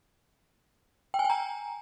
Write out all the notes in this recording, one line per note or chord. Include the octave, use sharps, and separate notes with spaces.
G5
G#5
G5
A#5